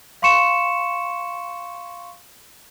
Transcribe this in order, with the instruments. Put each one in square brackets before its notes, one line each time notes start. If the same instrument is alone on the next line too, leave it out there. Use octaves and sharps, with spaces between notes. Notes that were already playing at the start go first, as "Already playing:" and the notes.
[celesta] F5 C6 C#6 C#7 E7